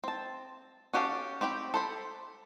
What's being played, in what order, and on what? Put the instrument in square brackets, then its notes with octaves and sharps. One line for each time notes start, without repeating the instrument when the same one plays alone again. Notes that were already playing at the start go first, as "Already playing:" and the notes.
[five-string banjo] C4 A5
C#4 F#4 G4 A4 F5
C4 G4 G5 B5
A4 C5 B5